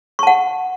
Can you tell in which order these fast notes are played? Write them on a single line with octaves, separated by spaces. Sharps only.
C#6 A5 F#5